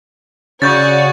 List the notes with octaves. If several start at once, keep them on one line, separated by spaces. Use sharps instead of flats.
C#3 F#4 C#5 D5 C#6 G6 A6